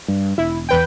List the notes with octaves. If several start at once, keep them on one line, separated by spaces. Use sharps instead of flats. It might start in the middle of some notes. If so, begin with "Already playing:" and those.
G2
E1 E4
E2 B4 G5